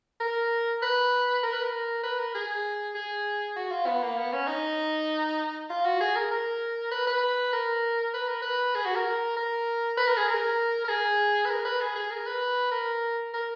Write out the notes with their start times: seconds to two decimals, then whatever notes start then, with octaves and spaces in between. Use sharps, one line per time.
0.20 A#4
0.82 B4
1.43 A#4
1.53 B4
1.64 A#4
2.03 B4
2.19 A#4
2.35 G#4
2.95 G#4
3.56 F#4
3.72 F4
3.87 B3
4.03 A#3
4.18 B3
4.33 C#4
4.48 D#4
5.70 F4
5.85 F#4
6.01 G#4
6.16 A#4
6.31 A#4
6.92 B4
7.07 B4
7.53 A#4
8.14 B4
8.27 A#4
8.42 B4
8.75 G#4
8.86 F#4
8.95 A#4
9.37 A#4
9.98 B4
10.07 A#4
10.17 G#4
10.28 A#4
10.84 A#4
10.89 G#4
11.45 B4
11.50 A#4
11.65 B4
11.81 G#4
11.96 G#4
12.11 A#4
12.26 B4
12.72 A#4
13.34 A#4